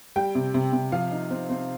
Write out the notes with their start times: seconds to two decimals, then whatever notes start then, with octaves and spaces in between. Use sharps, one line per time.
0.16 G3 G5
0.35 C3
0.54 C3
0.73 C3
0.92 F3 F5
1.11 D#4
1.30 C4
1.49 C4